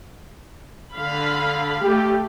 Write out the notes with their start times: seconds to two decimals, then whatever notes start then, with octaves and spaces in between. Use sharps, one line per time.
0.94 D3 F5 B5
1.83 A3 G4